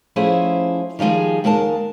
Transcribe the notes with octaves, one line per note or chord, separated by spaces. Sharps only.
F3 A3 C#4 E4 G#4 C5
D#3 F3 G3 G#3 G#4
D#2 G#3 A#4 G#5 A5